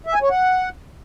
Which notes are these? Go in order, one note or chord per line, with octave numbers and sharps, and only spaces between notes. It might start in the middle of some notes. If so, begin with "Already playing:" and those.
E5
G#5
C#5
F#5